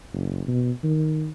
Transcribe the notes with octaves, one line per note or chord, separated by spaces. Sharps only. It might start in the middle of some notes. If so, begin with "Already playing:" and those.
F#1
B2
D#3